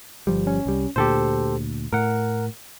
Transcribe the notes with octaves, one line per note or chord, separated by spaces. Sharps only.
G1 F3 G3
C#4
C2 G3
D2 A#2 G4 A4 C5
A2 A#4 F#5